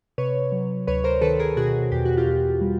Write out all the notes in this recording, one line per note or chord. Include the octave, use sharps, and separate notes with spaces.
C3 B4 C#5
F#3
D2 B4 C#5
A#4 C5
D#3 A4 B4
G#4 A#4
B2 F#4 G#4
E2 G4
F#4
F4 G4
E2
G3